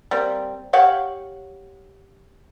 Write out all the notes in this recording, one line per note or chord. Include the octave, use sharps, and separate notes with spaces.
G3 A#3 C4
G4 C#5 F5 F#5